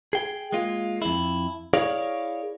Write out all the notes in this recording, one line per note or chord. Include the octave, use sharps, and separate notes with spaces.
G#4 G5
G#3 A#3 F4
F2 E4
E4 G#4 A#4 C#5 D5 F5